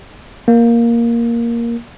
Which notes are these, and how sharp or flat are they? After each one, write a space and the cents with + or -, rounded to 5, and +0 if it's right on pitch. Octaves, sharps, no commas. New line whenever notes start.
A#3 +5